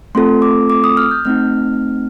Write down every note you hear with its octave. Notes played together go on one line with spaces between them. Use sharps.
A3 C4 F4 A4 C6
D6
D6
D#6
F6
G6
A3 C4 D#4 F6